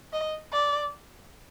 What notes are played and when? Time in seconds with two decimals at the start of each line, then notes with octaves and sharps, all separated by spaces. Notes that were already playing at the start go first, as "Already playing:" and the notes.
0.13 D#5
0.52 D5